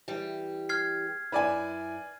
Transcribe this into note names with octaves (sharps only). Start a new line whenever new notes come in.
E3 G3 G4
F6 G#6 C7
F#2 E4 B4 D5 G#5